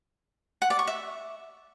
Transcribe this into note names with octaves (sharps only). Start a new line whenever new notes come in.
F#5
D5
C#6
E5